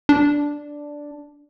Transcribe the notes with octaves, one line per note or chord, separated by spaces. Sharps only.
D4